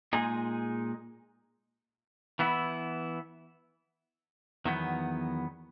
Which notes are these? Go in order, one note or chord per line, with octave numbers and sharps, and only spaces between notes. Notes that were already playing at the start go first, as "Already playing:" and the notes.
A#2 G#3 D#4 G#4
E3 B3 E4
E2 D#3 F#3 B3